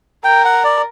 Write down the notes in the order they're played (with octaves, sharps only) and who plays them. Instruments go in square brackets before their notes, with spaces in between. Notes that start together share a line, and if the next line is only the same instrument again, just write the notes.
[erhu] A#4 [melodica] G5
[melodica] F#5
D5